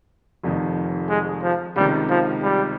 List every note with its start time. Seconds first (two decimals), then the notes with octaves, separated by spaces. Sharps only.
0.43 F1 F2 D#3
1.09 G#3
1.43 F3
1.76 C#2 C3 D#3 G3
2.10 F3
2.43 G3